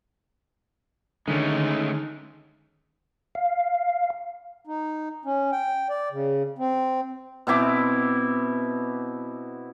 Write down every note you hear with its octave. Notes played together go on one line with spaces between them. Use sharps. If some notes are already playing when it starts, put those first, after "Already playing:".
D3 D#3 G#3 A3 C#4 D#4
F5
D#4
C#4
G5
D5
C#3
C4
B2 C4 E4 D6